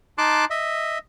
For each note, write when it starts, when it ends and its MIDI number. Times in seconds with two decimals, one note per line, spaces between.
0.18 0.45 63
0.18 0.45 81
0.18 0.45 84
0.18 0.45 86
0.18 0.45 90
0.50 0.98 75
0.50 0.98 76